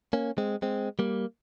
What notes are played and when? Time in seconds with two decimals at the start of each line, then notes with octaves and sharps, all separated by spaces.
0.13 A#3 C#4
0.38 G#3 C4
0.62 G#3 C4
0.99 G3 A#3